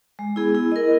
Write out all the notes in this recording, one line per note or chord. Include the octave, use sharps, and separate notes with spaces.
G#3
B3 E4 G#4
E4
A#4 D#5